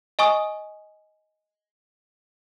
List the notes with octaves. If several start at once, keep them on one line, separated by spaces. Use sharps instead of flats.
D#5 G#5 C#6 D#6